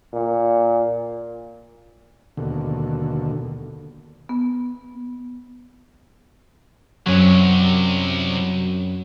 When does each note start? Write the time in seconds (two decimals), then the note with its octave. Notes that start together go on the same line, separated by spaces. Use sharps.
0.13 A#2
2.37 D#2 B2 D3
4.29 B3
7.06 C2 F#2 C3 F#3